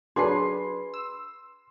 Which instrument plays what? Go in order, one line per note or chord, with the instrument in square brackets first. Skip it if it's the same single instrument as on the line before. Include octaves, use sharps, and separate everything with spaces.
[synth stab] F#3 D4 [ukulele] G#4 B4 [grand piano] C6 C7
[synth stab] E6